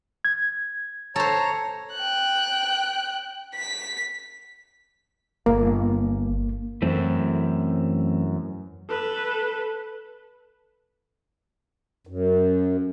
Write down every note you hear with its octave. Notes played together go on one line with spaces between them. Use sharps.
G#6
A4 C5 C#5 A#5
G5 F#6
B6
G1 A#3
F#2 E3 A3 C4
A4 B4
F#2